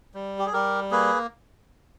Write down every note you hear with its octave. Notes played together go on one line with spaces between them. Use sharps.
G3
G4
G#4
G3 G4 A#4
A#3 G#4 B4